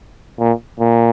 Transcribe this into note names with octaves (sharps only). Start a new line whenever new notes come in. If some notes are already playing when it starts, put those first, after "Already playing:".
A#2
A#2